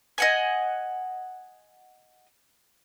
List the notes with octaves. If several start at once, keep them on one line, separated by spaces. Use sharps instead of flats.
D#5 F#5 G#5